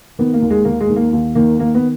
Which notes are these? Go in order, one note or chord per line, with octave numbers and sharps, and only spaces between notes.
D#3 B3
A#3
D#2
G#3
D#2 A#3
G#3
D#3
A#3
D#2
D#3 A#3
D#3 A#3
B3